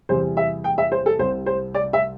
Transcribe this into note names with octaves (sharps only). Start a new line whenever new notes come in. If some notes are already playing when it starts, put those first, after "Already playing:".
E2 C3 E3 G3 C5
E5
G5
E5
C5
A4
C2 C3 G3 C5
C5
D5
E5